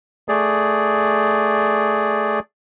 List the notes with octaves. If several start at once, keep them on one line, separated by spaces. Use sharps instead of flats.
A3 G#4 D5